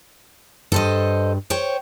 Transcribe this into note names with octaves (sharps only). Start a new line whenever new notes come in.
G2 A4 C5 D#5
C5 C#5 G5